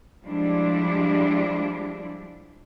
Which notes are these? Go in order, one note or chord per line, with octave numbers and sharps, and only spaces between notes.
F3 G3 G#3 D4 E4